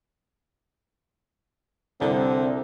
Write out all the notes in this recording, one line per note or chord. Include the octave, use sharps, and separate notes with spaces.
C2 D3 C4